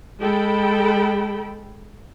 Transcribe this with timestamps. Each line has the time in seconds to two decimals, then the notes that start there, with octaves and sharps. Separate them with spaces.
0.20 G#3 A4 G5 B5